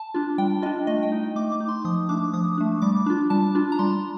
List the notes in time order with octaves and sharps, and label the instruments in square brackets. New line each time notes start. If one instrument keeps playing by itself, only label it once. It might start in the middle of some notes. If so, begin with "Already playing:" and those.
Already playing: [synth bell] A5
D4 F4
G3 G5
D4 F4 D#5
A3 D#5
G5
D#4
A3 D6
D6
D#4
C6
F3 D#6
A3 D4 D6
F3 D#6
A3 D4
G3 D6
D4 F4
G3 A5
D4 F4
A#5
G3 C6